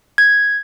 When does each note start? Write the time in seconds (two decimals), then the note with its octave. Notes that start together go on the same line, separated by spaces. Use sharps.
0.18 G#6